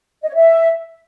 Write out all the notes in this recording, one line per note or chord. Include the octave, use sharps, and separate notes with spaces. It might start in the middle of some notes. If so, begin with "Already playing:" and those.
D#5
C#5
E5